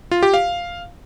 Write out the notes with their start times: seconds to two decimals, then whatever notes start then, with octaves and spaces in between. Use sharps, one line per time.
0.11 F4
0.23 G4
0.34 F5